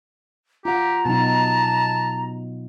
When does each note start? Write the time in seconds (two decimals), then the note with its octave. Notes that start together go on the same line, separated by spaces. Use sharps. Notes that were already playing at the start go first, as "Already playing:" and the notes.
0.65 F4 G4 F#5 A#5
1.05 B2 F#3 D#4 A5